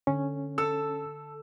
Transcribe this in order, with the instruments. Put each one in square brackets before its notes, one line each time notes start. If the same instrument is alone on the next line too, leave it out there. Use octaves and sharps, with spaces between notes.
[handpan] D3 [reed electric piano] C#4
[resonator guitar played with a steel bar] A4 [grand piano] E6